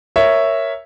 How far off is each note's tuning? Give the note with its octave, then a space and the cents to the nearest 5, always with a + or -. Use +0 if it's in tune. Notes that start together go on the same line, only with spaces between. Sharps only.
A#4 +0 C#5 +0 E5 +0